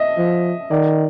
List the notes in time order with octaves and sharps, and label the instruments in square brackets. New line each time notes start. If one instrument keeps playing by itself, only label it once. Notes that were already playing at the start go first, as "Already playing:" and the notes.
Already playing: [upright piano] D#5 E5
[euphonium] F3
[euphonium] D#3 [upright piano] D5